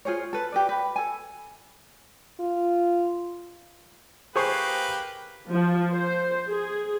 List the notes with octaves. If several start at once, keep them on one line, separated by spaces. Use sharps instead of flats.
F4 G#4 C5 C#5
A4 B4
G4 B4 D5
B4
A4 G#5
F4
A#3 G4 G#4 B4 C5 C#6
F3
C5
G#4